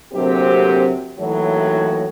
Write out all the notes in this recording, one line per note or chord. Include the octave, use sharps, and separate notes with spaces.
D2 C3 F#3 A#3 C4 G4
D#2 A2 E3 F#3